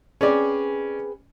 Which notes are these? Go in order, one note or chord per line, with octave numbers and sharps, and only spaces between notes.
C4 C#4 G#4 B4 D5